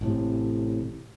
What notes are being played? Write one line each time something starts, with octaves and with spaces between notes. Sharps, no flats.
A1 A2 C3